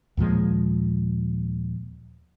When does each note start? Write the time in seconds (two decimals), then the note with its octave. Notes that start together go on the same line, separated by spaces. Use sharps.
0.17 D#2 A#2 F3 G#3